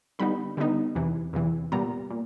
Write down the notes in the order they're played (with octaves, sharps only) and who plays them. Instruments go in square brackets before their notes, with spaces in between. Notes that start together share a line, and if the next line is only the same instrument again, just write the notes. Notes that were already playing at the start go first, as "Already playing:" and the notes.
[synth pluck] D3 G3 B3 D#4 B5
D3 G3 B3 D#4
E2 C3 E3
E2 C3 E3
A#2 G3 B3 A#5
A#2